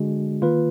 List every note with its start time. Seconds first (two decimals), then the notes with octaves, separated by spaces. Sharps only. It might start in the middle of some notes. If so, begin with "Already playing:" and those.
Already playing: D3 G#3 D4 F#4
0.42 D#3 A#3 F4 B4